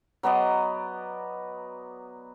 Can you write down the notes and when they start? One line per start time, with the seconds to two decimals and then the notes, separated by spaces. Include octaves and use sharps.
0.23 F#3 B3 D5 D#5